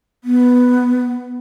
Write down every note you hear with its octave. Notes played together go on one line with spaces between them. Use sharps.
B3